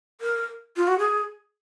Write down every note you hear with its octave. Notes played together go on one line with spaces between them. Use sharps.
A#4
F4
F#4
G#4